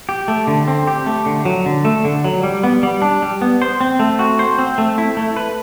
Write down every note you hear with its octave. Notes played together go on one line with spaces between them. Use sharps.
G4
A3
D3
C4
G4
A3
D3
F#3
D3
A3
D3
F#3
G3
B3
G3
D4
G3
B3
C5
C4
A3
F#4
C5
C4
A3
E4
A3
B4